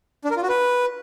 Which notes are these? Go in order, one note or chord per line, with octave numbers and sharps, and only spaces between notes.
D4
A#4
F4
F#4
B4